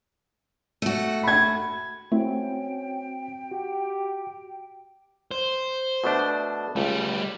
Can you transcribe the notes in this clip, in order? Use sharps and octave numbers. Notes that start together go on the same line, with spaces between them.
A3 F#4
B5 G#6
A3 C4 C#4 E4 F#4 G5
F#4 G4
C5
B2 A3 D4
C#2 G3 A3